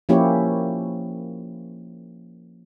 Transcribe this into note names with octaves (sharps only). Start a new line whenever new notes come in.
F3 A#3 C#4 E4 G4 C#5